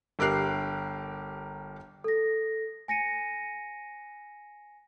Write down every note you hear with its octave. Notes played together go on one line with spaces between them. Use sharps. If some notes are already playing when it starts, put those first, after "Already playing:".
G1 G4 A#4 F#6 C7
A4 A#6
G#5 A#6 C#7 D#7